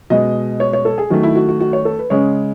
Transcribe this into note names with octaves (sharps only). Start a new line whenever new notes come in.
B2 G#3 D#5
C#5
C#5
A4
G#4
D#3 F#3 A3 F#4
E4
F#4
F#4
F#4
C#5
A4
B4
C#3 G#3 C#5